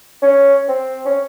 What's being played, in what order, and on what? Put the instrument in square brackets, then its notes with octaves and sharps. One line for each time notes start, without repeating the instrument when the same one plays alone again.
[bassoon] C#4
C4
C#4